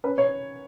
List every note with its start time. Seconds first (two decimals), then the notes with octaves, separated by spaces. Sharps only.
0.04 C#4 B4
0.18 C#5